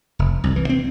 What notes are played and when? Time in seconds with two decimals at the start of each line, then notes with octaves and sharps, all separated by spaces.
0.19 F1
0.44 C2
0.56 E3
0.69 C4